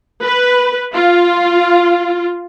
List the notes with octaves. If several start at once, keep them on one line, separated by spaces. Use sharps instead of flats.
B4
F4